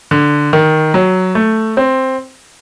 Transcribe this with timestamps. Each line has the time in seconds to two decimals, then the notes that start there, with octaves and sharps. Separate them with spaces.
0.11 D3
0.53 D#3
0.94 F#3
1.35 A3
1.77 C4